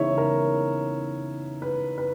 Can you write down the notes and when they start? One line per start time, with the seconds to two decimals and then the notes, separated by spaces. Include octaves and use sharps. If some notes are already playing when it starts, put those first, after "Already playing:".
Already playing: C#3 E3 B3 D#4 C#5 E5
0.18 A#4
1.62 B4
1.98 B4